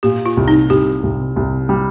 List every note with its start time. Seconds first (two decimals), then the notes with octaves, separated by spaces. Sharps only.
0.03 A#2 G4
0.26 F4
0.37 C2
0.48 D#4
0.70 C2 G4
1.03 C2
1.36 C2
1.69 G3